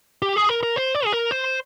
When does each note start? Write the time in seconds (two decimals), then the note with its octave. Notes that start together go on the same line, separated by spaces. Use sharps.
0.22 G4
0.36 G#4
0.49 A#4
0.63 A#4
0.76 C5
0.95 D5
1.05 G#4
1.13 A#4
1.31 C5